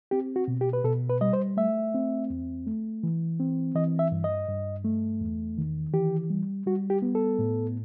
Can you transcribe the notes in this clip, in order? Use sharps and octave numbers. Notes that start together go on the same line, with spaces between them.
C4 G4
F#4
B2
G4
B4
B2 A4
B4
G3 D#5
C5
A3 E5
C4
E2
A3
E3
C4
E3 D#5
E5
G2
D#5
G2
A3
E2
D#3
E3 G4
G3
G3 F#4
G4
B3
A4
A2